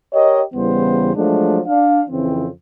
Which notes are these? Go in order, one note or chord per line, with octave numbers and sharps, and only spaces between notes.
G4 A#4 C#5 D#5
E2 C#3 E3 G3 B3 C5
F3 F#3 G#3 A3 D4
D4 F5
F2 C#3 E3 C4